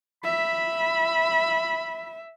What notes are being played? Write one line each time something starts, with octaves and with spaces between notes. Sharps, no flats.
E5 B5